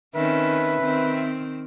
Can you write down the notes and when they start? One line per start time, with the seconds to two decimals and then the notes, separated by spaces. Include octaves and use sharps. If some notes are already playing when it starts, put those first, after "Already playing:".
0.15 D#3 C4 C#4 B4 E5
0.80 D#3 C4